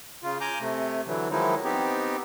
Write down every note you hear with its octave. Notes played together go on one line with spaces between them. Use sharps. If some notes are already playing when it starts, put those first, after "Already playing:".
C#3 F4
G#5 A#5 D6 G6
C3 A3
D3 E3 F#3
D#3 F3 F#3 G#3 D#4 E4
B3 C4 D#4 G4